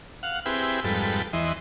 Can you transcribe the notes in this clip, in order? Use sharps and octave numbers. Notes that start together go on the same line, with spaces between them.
F5 F#5
C4 E4 G4 G#4 B4
F2 G#2 G3 A4 B4
E2 E3 D#5 C6